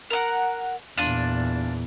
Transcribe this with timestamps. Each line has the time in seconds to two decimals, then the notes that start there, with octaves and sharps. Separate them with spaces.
0.10 A#4 F#5
0.97 E2 A#2 D4 F4